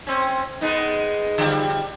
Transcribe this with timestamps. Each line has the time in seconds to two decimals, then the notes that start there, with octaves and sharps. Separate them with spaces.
0.07 C4 C#4
0.61 G#3 B3 D#4
1.38 D3 F3 G3